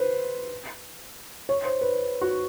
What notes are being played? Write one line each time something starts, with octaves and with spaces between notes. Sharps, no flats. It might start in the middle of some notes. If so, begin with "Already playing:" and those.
Already playing: B4 C5
C#5
C5
B4
F#4